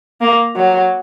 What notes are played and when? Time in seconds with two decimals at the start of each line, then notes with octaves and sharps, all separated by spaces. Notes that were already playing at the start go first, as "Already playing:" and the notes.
0.21 A#3
0.56 F#3